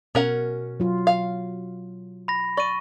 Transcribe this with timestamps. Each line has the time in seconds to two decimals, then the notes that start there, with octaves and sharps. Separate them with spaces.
0.15 B2 C#4 A#4 F#5
0.80 F#3 F4
1.07 F5
2.28 B5 A#6
2.57 D5 C#6 D#7